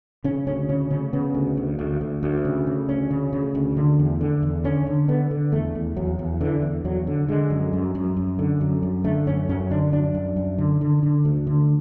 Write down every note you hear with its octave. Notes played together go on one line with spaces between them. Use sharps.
C#3 C#4
D2 C#4
C#3 C#4
C#3 C#4
C#3 B3
D2
D2
D2
D2
D2
C#3
C#3
D2 C#4
C#3
C#3
D2
D3
E2
D3
E2
D3 C#4
D3
D3 B3
D3
E2 A3
E2
E2 F#3
E2
D3 E3
E2
E2 F#3
D3
D3 G#3
F#2
F#2
F#2
F#2
D3
F#2
F#2
D3 A3
F#2 C#4
F#2 C#4
D3 D4
F#2 D4
F#2
F#2
D3
D3
D3
D2
D3